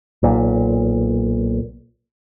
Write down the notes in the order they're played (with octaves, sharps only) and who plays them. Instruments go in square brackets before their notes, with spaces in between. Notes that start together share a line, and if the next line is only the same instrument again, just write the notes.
[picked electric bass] B1 A#2